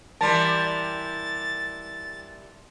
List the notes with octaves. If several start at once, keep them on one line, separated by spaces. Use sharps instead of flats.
E3 G3 A#4 A5 C6 A6